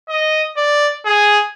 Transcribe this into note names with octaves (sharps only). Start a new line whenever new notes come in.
D#5
D5
G#4